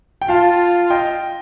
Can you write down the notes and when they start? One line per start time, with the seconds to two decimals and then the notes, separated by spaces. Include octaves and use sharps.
0.22 G5
0.28 F4 F5 A5
0.90 D#5 G5